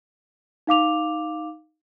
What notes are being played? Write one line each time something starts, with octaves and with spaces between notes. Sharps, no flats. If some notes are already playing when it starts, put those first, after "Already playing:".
D#4 F5 D6 F7